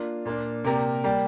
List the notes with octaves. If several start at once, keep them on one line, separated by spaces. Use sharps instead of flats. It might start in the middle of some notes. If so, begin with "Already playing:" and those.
Already playing: A#3 D4 F4
A#2 A#3 D4
C3 A#3 G4 A#4 D5
G3 A#3 G4 D5